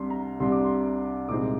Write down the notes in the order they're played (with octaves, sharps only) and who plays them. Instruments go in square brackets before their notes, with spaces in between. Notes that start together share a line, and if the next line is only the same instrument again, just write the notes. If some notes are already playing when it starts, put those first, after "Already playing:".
Already playing: [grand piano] C2 C3 G3 D4 C6
A#5
C2 C3 G3 D4 C6
D6
C6
C2 A#2 G#3 C4 D#4 D6